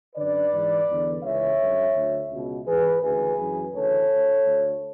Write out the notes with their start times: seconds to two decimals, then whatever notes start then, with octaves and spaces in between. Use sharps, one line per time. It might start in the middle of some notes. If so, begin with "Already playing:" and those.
0.16 F#2 D3 B4 D5
0.52 G#2 E3
0.88 E2 D3
1.24 C#2 C#3 E3 C#5 E5
1.59 F#2 D3
1.96 D2 D3
2.31 C#2 B2
2.66 G#2 E3 G#4 B4
3.02 D2 C#3 E3 G#4 B4
3.38 F#2 E3
3.74 D2 C#3 E3 A4 C#5
4.10 D2 D3
4.46 D2 D3